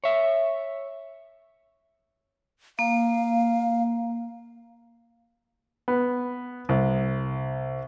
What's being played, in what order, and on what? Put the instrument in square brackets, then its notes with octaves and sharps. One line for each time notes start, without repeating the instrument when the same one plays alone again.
[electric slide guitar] C#5 E5
[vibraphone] A#3 [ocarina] F5
[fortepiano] B3
C2